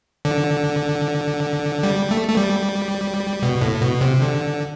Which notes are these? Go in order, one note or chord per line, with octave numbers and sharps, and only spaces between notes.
D3
G3
A3
A3
G3
B2
A2
B2
C3
D3